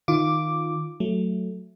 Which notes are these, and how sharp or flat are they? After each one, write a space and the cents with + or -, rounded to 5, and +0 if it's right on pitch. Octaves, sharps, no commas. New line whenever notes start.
D#3 +0 F4 +0 D6 +0
F#3 +0 A3 +0